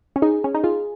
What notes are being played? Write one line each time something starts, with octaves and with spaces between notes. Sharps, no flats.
C#4
D#4 G#4
C#4
D#4
F4 G#4